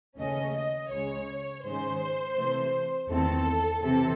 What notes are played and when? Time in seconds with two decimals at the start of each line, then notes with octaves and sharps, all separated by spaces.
0.17 D#2 C#3 E3 A3 C#4 D#5
0.54 D#5
0.90 C#2 C#3 G#3 C#5
1.63 G#2 D#3 G#3 C#4 C5
2.36 C3 E3 A3
3.10 E2 D#3 A3 C4 A4
3.82 C3 E3 C4 A4